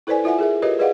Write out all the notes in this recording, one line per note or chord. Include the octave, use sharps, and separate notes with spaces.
E4 A4 B4 C5 D5 G#5
E4 F4 E5 F#5 G#5
G#4 A#4 E5
F4 G4 A#4 B4 C#5 D#5
G#4 B4 D5 D#5 F5 F#5